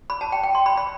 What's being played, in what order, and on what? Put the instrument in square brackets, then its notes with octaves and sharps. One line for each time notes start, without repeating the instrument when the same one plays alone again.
[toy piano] B5
A5
G5
G5
C6
B5
B5